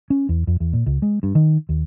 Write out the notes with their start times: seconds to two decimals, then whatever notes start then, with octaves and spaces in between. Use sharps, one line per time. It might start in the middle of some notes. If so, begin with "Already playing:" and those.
0.10 C#4
0.29 E2
0.47 F2
0.60 E2
0.73 A#2
0.86 C#2
1.02 G#3
1.23 G2
1.35 D#3
1.69 D#2